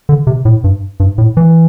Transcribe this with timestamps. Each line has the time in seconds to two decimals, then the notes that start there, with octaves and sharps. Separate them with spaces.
0.09 D3
0.27 C3
0.45 A2
0.64 G2
1.00 G2
1.18 A2
1.37 E3